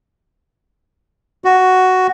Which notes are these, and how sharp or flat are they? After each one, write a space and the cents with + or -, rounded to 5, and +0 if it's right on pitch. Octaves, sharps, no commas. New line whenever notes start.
F#4 +5